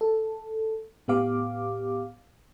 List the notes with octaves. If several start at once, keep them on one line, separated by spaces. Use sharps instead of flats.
A4
A2 B3 G4 F5 D6